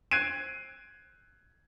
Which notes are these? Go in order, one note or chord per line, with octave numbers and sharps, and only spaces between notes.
F#6 G#6 C7 D7 D#7